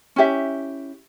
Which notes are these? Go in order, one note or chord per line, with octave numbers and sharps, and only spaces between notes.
C#4 E4 G4 E5